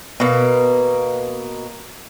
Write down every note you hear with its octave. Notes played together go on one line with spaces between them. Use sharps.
B2 A#3